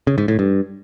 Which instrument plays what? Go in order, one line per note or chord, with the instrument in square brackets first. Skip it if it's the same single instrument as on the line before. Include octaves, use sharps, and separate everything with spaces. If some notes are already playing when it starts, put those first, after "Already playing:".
[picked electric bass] C#3
G#2
A2
G2